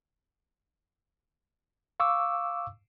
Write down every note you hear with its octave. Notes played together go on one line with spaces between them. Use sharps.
F5 C#6 D6 E6